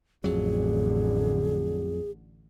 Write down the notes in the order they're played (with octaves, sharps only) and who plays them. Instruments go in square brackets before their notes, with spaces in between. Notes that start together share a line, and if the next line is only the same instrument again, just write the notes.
[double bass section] A1 D3 [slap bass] F2 F#3 [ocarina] G#4